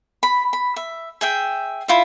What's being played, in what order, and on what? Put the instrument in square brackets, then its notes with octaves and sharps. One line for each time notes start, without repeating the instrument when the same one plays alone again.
[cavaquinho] B5
B5
E5
G#4 E5 G5
E4 F4 E5